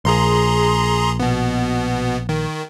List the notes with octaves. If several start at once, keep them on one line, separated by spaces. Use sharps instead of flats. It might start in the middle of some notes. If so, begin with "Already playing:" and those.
A#1 G#4 A#5 C6
B2 B3
D#3